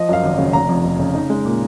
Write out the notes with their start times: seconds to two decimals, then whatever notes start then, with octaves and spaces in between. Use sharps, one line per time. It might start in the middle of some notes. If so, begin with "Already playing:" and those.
Already playing: F3 D#5
0.09 F#2 F5
0.23 G#1
0.38 C#3
0.53 F1 A#5
0.69 F2
0.84 F1
0.99 C#3
1.14 D#4
1.30 G#3
1.45 A#2